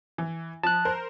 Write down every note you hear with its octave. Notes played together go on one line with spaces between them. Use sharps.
E3
F3 A5 F#6
A#4 C5